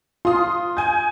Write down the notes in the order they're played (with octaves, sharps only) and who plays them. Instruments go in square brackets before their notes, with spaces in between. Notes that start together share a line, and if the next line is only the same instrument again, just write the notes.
[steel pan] F4 [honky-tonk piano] C6 D#6
[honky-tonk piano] G#5 G6